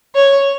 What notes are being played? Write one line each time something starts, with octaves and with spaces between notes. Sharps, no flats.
C#5